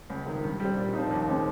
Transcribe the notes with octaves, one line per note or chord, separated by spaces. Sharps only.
C#2
C3 D#3
G2
G3 C4
A#2
F3 C4 D#4
D#2
C#3 G#3 C4